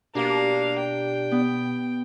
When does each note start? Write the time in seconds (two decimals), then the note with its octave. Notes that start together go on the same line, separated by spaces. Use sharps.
0.15 B2 A#3 D4 G4 F5
0.79 G5
1.31 B3